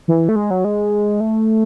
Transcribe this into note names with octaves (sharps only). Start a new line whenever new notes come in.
E3
A3
G#3
F#3
G#3
A3